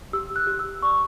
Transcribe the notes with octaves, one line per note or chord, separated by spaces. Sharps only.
G4 E6
F#6
G4
E6
D5 C#6